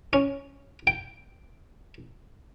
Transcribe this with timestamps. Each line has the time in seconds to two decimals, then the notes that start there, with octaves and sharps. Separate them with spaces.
0.13 C#4
0.87 G5